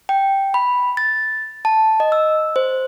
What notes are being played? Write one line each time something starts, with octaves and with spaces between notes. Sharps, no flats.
G5
B5
A6
A5
D#5
E6
C5